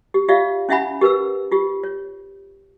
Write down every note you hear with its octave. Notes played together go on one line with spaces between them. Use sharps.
G4
F4 G4 D5 E5 F5
C#4 E4 E5 F#5 G#5 B5
G4 A#4 B4 E6
F4 G4
C#5